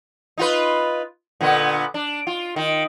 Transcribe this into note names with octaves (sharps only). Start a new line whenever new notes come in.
D#4 F4 B4
A#2 D3 B3
D4
F4
D#3